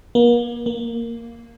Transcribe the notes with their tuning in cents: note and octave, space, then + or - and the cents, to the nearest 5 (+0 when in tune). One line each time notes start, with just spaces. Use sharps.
A#3 +40
A#3 -5